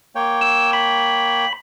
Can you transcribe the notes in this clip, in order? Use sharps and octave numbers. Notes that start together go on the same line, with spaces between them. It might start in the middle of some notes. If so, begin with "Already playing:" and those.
A#3 C#5 G5
E6
B5